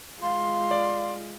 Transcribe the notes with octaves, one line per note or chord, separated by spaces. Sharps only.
G#3 F4 F5 C6
D5